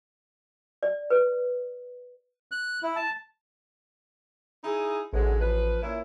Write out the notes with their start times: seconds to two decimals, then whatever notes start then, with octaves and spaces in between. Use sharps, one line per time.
0.83 D5
1.10 B4
2.52 F#6
2.83 E4
2.96 A5
4.64 D#4 E4 G#4
5.13 A1 D3 F#3 G#3
5.40 F3 B4
5.82 A#2 C#4 E4